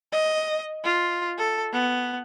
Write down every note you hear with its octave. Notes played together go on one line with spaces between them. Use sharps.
D#5
F4
A4
B3